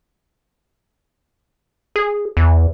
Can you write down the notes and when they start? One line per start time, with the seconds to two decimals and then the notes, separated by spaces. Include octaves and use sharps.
1.96 G#4
2.37 E2